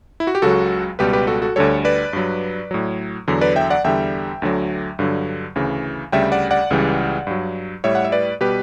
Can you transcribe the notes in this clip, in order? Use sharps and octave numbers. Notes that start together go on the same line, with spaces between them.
E4
F#4
G4
C#2 C#3 F#3 F#4 A4
C#2 B2 G3 G4 B4
G4 B4
F#4 A4
F#4 A4
D2 D3 G3 A4 C#5
B4 D5
G2 F#3
A2 F#3
E2 D3 F#3
B4 D5
E5 G5
D5 F#5
E2 D3 G3 E5 G5
D2 D3 F#3
G2 D3 F#3
D2 C#3 E3
D2 C#3 G3 E5 G5
D5 F#5
D5 F#5
C#2 C#3 E3 G3
G2 F#3
A2 G3 C#5 E5
F#5
E5
B4 D5
B2 G3 G4 B4